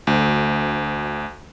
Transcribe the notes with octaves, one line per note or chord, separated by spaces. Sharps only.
D2